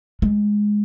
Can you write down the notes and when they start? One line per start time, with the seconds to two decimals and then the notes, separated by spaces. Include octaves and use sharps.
0.22 G#3